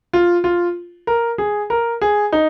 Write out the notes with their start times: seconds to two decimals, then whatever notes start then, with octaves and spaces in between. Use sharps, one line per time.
0.13 F4
0.44 F4
1.07 A#4
1.38 G#4
1.70 A#4
2.01 G#4
2.32 D#4